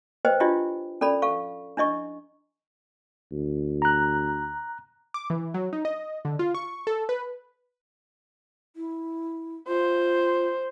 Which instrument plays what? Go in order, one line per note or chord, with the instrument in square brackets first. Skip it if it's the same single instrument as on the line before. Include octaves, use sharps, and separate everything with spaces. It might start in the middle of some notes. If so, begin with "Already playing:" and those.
[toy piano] B4 C5 D#5 G5
D4 E4 F4 G4 D#5
C#4 A4 D5 B5
A4 F5 C#6
D4 E4 D#5 C#6
[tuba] D2
[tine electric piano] A#5 F#6
[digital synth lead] D6
E3
F#3
D#4
D#5
D3
F4
C#6
A4
B4
[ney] E4
[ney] F4 [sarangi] C5